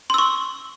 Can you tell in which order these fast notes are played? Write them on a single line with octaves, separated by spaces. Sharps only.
C6 E6 C#6